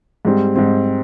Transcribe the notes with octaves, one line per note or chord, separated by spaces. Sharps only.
G#2 G3 C4
G#2 G3 C4